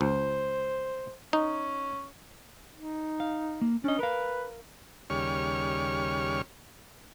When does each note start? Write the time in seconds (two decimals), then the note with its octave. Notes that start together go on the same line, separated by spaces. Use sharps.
0.01 C#2 C5
1.33 C#4 D#4
2.75 D#4
3.20 F5
3.62 A#3
3.84 C#4 D4 D#5
3.99 A#4 B4 F5
5.10 D#2 C#3 G3 C#5 C#6 F6